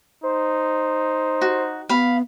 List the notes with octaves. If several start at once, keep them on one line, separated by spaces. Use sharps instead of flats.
D#4 C5
F#4
B3 F5 B5